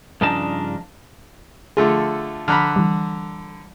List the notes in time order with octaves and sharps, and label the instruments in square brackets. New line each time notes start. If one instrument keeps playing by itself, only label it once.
[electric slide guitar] G2 C#3 F3 D4 D#4 A5
[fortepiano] D3 A3 F4 [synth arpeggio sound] G#4
[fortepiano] D3 A#5 B5 [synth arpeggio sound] F6 F#6 B6
[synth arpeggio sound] E3 G3